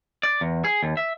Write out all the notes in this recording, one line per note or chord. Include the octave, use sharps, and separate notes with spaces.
D5
E2
G#4
D#2
E5